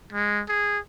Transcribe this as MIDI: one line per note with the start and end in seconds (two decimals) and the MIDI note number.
0.13 0.42 56
0.48 0.79 68